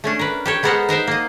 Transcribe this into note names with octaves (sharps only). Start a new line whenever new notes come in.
A3 C#4 D4
A#4 B4
G4 A4 C#5
G#3 B3 A4 A#4 C5 F#5
D#4 A#4 C5 E5
A#3 D#5